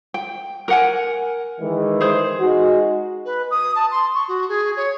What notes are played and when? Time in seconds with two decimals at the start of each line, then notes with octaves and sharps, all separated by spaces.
0.14 G5
0.68 A#4 F#5 G#5
1.60 D#3 E3 G#3
2.01 G#4 C5
2.40 G#3 D#4 F#4
3.25 B4
3.51 D#6
3.75 A5
3.91 C6
4.14 C#6
4.28 F#4
4.49 G#4
4.77 C#5